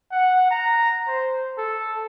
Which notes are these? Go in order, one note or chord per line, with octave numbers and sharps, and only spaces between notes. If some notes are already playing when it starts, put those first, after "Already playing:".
F#5
A#5
C5
A4